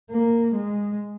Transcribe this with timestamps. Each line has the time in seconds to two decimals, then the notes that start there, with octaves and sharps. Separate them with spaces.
0.11 A#3
0.56 G#3